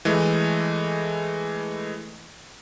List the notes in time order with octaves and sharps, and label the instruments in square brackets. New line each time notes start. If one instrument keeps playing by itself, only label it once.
[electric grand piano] E3 G#3 A3